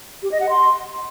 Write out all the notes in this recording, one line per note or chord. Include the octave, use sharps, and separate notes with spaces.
G4
D#5
F#5
C6